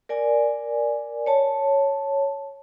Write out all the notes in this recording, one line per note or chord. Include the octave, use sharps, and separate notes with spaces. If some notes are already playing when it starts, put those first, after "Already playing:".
A#4 D5 G#5
C#5 A5